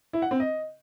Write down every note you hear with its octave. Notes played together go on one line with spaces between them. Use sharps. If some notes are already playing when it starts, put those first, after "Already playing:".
E4
F#5
C4
D#5